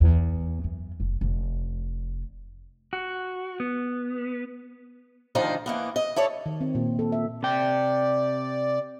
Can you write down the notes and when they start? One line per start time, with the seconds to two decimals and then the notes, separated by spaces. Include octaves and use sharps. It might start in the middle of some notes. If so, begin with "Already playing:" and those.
0.01 E2
0.64 F#2
1.00 F1
1.21 F1
2.93 F#4
3.60 B3
5.35 D2 D#3 F3 D4 D#4 C5
5.66 E3 A#3 B3
5.96 D#5
6.16 E4 A4 C#5 D5
6.46 D#3
6.61 C4
6.75 A#2
6.99 A4
7.12 E5
7.43 C3 D5 G5